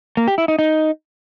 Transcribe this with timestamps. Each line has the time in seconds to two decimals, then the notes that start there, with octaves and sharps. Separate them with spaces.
0.17 A#3
0.28 G4
0.38 E4
0.48 D#4
0.59 D#4